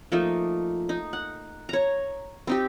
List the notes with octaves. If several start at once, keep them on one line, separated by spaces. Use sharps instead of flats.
F3 A3 A#3 D#4
D#4
F#5
C#5 A#5
C4 D#4 G4